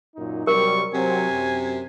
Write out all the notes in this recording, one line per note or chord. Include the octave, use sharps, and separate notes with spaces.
F#2 A#2 D#4
C3 F#3 G3 A#4 C#6
C3 F#3 C4 G#5
F#2